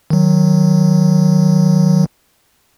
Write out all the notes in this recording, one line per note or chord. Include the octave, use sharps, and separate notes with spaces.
D#3 F#3